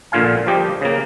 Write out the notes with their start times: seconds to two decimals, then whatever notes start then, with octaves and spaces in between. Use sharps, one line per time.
0.12 A#1 A#2 D3 F4 F5 G#5
0.47 F3 G3 G4 D#5
0.81 C#3 A#3